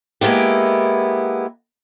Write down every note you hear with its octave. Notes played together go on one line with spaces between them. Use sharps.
G#3 A#3 B3 E4 G4